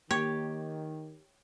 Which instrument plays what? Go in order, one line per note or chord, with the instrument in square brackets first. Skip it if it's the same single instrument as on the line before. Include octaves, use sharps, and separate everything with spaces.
[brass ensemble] D#3 [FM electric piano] A#3 [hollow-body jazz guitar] G4 [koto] C#5